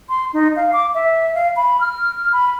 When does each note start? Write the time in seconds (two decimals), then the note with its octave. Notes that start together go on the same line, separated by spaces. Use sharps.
0.09 C6
0.33 D#4
0.56 F5
0.73 D6
0.94 E5
1.35 F5
1.56 B5
1.81 F6
2.32 B5